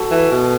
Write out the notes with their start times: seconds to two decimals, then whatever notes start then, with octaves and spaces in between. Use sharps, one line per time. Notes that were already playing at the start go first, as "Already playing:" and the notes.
Already playing: F#4 A4 F#5 A5
0.11 E3
0.32 B2